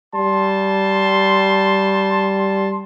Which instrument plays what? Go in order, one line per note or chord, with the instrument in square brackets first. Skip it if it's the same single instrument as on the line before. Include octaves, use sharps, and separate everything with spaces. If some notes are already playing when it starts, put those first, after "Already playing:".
[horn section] G3 A5 C6